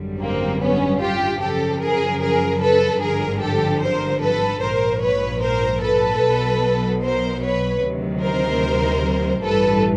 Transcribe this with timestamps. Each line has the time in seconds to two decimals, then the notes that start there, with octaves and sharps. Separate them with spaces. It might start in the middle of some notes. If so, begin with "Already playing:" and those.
Already playing: G#1 F#2 D3 G3
0.21 A#3 C4
0.62 B3 C#4
1.01 F4 G4
1.41 F#2 C#3 F3 G4 A4
1.81 G#4 A#4
2.21 G#4 A#4
2.62 A4 B4
3.01 G#1 G2 D3 F3 G#4 A#4
3.41 G4 A4
3.82 A#4 C5
4.22 A4 B4
4.62 A#1 G#2 F3 A#4 C5
5.02 B4 C#5
5.42 A#4 C5
5.82 A4 B4
6.23 B1 B2 F#3
7.03 A#4 C5
7.43 B4 C#5
7.83 D2 C3 D#3 F#3
8.23 A#4 C5
9.44 A1 G2 E3 G3 A4 B4